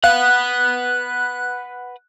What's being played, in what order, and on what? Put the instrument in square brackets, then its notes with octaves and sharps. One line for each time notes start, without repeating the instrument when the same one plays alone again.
[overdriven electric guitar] B4 F#5 [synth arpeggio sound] F5 [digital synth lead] F#6